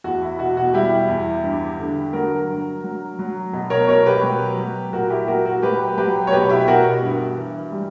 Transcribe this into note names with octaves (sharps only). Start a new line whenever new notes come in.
E2 F#4
E4
B2 F#4
F#4
G3 E4 G4
E2
G2
D3
F#3 F#4 A#4
G2
F#3
F#3
B2
A#4 C#5
B2 A#4 C#5
G4 B4
F#3
F#3
A#2 F#4 A#4
E4 G4
A#2 F#4 A#4
F#4 A#4
F#3 G4 B4
F#3 G4 B4
C#5
B2 G4 B4
E4 G4
B2 F#4 A#4
G2
E3
G3